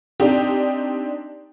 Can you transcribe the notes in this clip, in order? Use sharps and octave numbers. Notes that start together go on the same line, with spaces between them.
C4 D4 D#4 G4